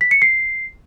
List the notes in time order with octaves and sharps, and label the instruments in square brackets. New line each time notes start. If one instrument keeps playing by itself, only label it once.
[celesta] B6
C#7
C7